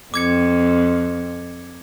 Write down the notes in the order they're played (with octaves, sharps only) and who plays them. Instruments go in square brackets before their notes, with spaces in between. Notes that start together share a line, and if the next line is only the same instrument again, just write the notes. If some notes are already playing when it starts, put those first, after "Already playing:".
[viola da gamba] F2 [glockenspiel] D6 G#6 C#7